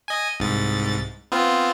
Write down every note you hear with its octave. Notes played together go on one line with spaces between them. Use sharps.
D#5 G#5
C2 G#2 A6
B3 C4 F4